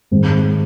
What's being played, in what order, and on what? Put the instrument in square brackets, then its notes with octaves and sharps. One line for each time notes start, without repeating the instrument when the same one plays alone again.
[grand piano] G#2 D#3 G#3 C4